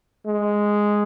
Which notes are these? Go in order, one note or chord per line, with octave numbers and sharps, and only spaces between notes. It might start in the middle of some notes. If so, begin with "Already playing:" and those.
G#3